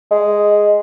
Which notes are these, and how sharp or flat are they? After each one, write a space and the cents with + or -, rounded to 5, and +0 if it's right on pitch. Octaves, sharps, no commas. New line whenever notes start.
G#3 +0